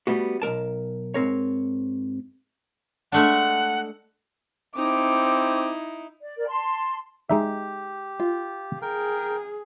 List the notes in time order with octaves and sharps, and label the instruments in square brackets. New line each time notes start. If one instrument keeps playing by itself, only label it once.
[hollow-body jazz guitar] G3 A3 B3 F#4
B1 G#3 A#4 A5
G#2 C4 A#4 C#5
[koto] G#3 A3 D4 [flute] F#5
[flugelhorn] C4 [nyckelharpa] D#4 E4 [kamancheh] D6
[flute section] D5
A#4 D5
A5 C6
[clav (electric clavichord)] G#3 D#4 E5 [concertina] G4
[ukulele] F4
[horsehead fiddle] G#4 [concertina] A#4 G5